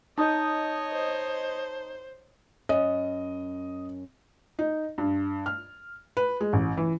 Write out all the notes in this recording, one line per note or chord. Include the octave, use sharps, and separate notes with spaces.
D#4 C#5 D#5 A5 D#6 G6
C5
F#2 C#4 D#5
D#4
G2
F6
B4
G#3
A1
E3